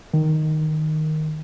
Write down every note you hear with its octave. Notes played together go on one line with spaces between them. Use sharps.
D#3